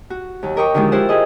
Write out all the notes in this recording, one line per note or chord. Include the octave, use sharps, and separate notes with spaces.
F#4
D#2 F#3
G4 A#4 D#5 G5 C#6 D6
D3 D#3 F3 F#3 G#3 D#4
E4 F4 G4 C5 F#5
G4 G#4 D#5